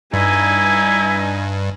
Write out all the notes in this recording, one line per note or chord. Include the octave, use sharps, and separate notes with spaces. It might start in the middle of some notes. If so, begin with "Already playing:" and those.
G2 D#4 E4 G#5